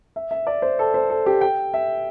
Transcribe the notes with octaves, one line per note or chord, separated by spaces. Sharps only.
E5
E5
D5
C5
A4
C5
A4
G4
G5
E5